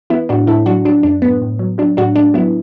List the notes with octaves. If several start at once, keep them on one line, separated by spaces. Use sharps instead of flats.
E3 B3 E4
A2 D4 F#4
A2 E4 A4
F#3 D4 F#4
F#3 D4
F#2 D4
A2 B3
A2
F#3
F#3 D4
A2 D4 F#4
A2 D4
F#3 B3 E4